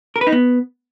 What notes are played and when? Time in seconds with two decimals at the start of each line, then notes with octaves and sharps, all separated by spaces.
0.16 A#4
0.21 B4
0.27 D#4
0.32 B3